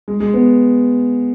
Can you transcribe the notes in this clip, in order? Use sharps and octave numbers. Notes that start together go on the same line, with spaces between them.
G#3
G#3
B3